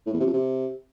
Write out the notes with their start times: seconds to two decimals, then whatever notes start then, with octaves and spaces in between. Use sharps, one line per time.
0.06 A2
0.13 E2
0.20 C3
0.27 F2
0.33 C3